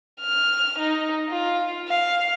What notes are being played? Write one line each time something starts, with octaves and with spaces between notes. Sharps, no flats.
F6
D#4
F4
F5